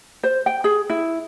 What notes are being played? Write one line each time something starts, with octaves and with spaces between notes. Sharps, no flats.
C5
G5
G#4
E4